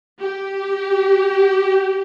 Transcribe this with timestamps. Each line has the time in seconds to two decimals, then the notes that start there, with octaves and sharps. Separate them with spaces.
0.21 G4